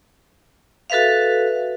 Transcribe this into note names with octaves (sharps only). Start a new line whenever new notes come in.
F#4 A4 B4 E5 F5